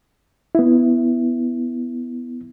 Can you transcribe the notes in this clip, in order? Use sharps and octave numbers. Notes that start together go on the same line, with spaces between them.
B3 E4